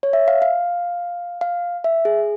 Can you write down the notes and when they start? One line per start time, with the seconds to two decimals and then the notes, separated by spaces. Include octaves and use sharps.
0.03 C#5
0.13 E5
0.28 F5
0.42 F5
1.41 F5
1.84 E5
2.05 G#4